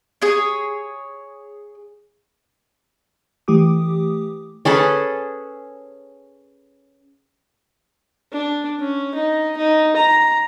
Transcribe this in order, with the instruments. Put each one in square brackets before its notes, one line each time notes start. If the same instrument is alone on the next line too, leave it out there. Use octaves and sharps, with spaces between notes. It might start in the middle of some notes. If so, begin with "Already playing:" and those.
[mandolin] G#4 C#5
[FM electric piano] E3 A3 G4 D6 D#6
[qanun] C#4 G#4 A4 B4
[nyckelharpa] D4
C#4
D#4
D#4
A#5